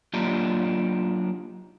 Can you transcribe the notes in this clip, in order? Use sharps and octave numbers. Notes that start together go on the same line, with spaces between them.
F#3 A#3 D4 D#4 F4 G4